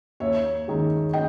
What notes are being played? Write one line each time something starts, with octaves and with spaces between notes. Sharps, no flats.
D#2 C#5 E5
D#3 G#3
D#5 G5